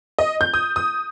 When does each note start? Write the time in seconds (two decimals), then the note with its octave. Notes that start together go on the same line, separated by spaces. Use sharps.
0.19 D#5
0.41 G6
0.54 D#6
0.76 D#6